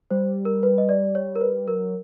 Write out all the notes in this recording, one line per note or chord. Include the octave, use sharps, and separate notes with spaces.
G3 C5
A#4
B4
D#5
D5
C#5
A#4
B4
F#3 A#4